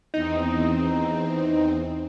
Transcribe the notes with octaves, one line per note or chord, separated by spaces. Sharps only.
E2 C4 D#4